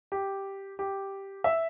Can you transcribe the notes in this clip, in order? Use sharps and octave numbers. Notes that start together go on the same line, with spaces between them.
G4
G4
E5